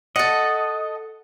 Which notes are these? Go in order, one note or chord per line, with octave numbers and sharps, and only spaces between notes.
A4 D#5 F#5